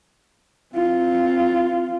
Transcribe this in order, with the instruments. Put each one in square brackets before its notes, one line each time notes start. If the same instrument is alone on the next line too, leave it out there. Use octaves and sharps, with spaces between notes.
[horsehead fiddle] C4 F4